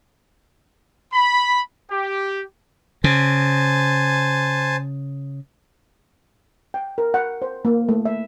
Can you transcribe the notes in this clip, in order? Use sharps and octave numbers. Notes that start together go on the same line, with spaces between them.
B5
G4
C#3 C5 G#5 A5
G5
A#4
F#5
C5
A#3
A3
E5